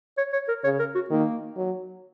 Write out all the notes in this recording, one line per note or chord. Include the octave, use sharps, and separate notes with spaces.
C#5
C#5
A#4
C#3 C#5
A#4
F#4
D#3 A#3
F#3